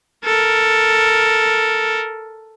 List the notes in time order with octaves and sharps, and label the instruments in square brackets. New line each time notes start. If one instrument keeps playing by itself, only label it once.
[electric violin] A4 A#4